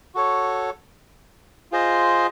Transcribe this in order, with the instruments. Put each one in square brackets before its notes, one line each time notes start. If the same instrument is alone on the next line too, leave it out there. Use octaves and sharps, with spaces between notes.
[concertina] F#4 A4 C#5
F4 G#4 C5 D#5